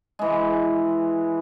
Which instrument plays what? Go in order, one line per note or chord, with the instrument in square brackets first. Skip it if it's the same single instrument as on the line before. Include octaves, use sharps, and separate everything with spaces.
[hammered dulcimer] E3 G#3